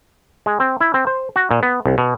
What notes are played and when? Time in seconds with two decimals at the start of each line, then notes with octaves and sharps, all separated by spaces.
0.46 G#3
0.60 C4
0.80 E4
0.94 C4
1.07 C5
1.36 F#4
1.51 A#2
1.63 B3
1.86 C2
1.98 B2